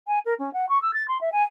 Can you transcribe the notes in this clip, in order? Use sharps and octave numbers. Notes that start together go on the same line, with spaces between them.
G#5
A#4
C#4
F#5
C#6
E6
A6
C6
E5
G#5